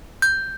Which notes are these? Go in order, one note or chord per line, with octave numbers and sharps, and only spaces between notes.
G6